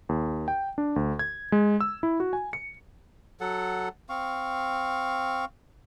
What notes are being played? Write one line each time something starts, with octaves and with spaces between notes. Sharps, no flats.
D#2
G5
D4
D2
G#6
G#3
E6
E4
F#4
G#5
C#7
F#3 A4 F#5
C4 F5 C#6